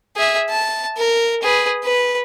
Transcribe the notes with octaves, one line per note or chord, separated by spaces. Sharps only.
G#4 E5
A5
A#4
G#4 B4
B4